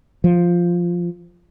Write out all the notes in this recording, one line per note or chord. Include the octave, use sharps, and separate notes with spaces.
F3